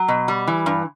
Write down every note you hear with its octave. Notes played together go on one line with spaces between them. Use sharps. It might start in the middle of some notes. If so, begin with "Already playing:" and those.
Already playing: F#3
B2
G3
E3
G2